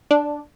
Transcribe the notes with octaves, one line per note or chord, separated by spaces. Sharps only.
D4